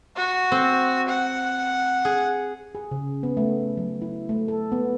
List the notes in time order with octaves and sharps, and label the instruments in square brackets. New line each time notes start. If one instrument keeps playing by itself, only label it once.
[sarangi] F#4
[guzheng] C4
[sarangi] F#5
[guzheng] G#4
[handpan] G#4
C#3
B3
A3
F#3
E4
A3
A4
B3